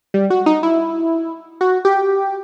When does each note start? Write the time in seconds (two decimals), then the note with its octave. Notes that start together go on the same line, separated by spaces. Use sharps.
0.14 G3
0.30 F#4
0.46 D#4
0.63 E4
1.61 F#4
1.85 G4